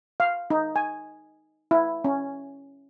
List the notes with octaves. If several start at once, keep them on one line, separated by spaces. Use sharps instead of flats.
F5
D#4
G#5
E4
C#4